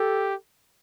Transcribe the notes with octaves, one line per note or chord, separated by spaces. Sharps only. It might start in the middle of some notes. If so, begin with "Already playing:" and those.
Already playing: G4 A4